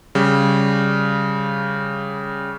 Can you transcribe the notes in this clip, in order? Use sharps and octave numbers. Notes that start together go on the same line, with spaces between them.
C#3 G3